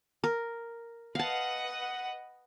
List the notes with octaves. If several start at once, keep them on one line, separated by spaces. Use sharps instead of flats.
A#4
B4 D#5 F5 F#5 A5